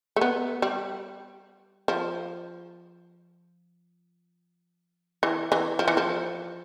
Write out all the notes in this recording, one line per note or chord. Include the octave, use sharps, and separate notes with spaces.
A3
B3
G3
F3
E3
E3
F3
E3
F3